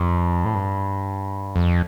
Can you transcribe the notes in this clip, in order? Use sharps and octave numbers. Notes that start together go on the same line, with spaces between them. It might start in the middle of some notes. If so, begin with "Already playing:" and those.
Already playing: F2
A2
G2
F2